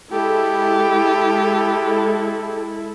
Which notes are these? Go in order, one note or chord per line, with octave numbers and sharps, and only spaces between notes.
G#3 E4 G4 A4